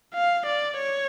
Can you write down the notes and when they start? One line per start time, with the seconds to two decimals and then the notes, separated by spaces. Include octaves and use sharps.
0.14 F5
0.46 D5
0.78 C#5